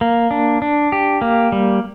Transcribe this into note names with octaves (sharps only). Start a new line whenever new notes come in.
A#3
D4
D4
G4
A#3
G3